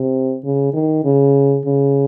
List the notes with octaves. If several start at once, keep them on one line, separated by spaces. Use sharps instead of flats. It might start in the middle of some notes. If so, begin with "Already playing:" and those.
Already playing: C3
C#3
D#3
C#3
C#3